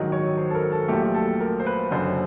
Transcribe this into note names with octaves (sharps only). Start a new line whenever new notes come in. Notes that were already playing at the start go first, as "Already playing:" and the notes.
Already playing: A#1 G#2 D#3 F#3 D#5
C#5
C5
A4
A#4
A4
A#1 A#2 F#3 A3 G4
A4
A#4
C5
B4
F#1 F#2 D3 C5